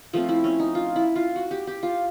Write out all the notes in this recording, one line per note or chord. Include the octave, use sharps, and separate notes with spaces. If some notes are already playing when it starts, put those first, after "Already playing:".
F3 A3 C4 F4
E4
C#4
D#4
F4
E4
F4
F#4
G4
G4
F4